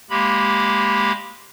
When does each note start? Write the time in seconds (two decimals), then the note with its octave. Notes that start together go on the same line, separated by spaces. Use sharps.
0.10 G#3 A#3 G4 B5